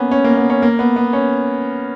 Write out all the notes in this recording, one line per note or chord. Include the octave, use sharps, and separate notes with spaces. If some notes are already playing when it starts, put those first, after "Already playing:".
Already playing: A#3 B3 C#4
C#4
A#3
B3
C#4
A#3
B3
B3
C#4